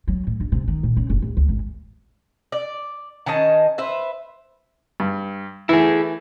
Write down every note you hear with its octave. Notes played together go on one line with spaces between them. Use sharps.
F#3
A2
G2
C3
D#3
A#2
C#3
F#1
D1
D2
G#1
D5
D#3 C#4 D#5 A5
B4 C5 E5
G2
E3 A3 E4 G#4